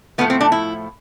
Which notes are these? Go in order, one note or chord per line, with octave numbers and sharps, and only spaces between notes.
A2 F3 A3 B3
C4
D4
E4